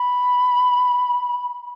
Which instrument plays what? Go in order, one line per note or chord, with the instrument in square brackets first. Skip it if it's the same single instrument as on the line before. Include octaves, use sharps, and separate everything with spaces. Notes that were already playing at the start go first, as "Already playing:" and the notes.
Already playing: [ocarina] B5